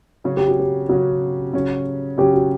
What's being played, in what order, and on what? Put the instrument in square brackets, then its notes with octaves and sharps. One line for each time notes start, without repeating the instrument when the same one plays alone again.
[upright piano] C#3 F#3 C#4
[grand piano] G4
F#4
G4
[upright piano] C#3 F#3 C#4 [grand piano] F#4
[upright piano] C#3 F#3 C#4
[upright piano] C#3 F#3 C#4 [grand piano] G4
[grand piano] F#4